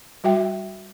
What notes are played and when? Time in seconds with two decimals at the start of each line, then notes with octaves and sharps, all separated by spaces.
0.24 G3 F#4 E5 G5